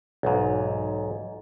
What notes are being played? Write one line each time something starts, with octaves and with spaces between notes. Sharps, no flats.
B1 E2 G#2